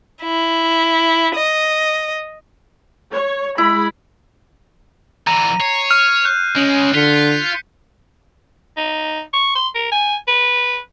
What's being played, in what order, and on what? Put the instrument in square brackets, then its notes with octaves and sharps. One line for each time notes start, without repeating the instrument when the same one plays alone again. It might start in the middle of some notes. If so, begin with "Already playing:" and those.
[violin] E4
D#5
[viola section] C#5
[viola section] G#3 B5 [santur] E4
[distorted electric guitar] D3 E3 [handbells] A#5 [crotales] D#7
[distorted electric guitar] C#5 [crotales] C7
[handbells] F6 [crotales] D#7
[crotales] F#6 G6
[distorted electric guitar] C#3 G#3 [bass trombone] C#4
[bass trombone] D3 [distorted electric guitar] F4 [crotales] B6 C#7
[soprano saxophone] D#4
C#6
C6
A#4
G#5
B4